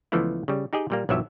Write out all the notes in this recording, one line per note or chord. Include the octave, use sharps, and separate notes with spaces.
C#2 E3 F3 A3 B3 E4
C#3 G3
D#4 G4 G#4 D#5 G5
A#2 G3 A#3
B1 G2 F3 F#3 G4 E5